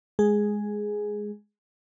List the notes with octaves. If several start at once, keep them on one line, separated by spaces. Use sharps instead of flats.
G#3 G#4